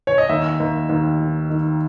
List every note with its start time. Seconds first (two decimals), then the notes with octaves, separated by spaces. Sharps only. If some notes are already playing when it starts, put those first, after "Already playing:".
0.07 C#5
0.18 D#5
0.29 D#2 E5
0.60 D#2
0.89 D#2
1.20 D#3
1.50 D#3